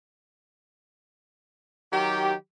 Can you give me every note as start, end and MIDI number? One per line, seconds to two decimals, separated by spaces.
1.93 2.34 51
1.93 2.34 54
1.93 2.34 67